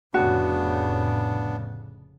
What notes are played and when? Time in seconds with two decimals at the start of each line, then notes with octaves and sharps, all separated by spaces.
0.14 F1 A2 C#3 B3 D4 F#4